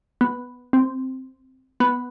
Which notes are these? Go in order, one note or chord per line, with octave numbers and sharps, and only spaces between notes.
B3
C4
B3